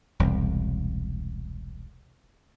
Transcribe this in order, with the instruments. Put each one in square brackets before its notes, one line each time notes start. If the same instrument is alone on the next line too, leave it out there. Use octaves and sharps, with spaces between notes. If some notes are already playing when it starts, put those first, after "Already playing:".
[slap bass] E1 C2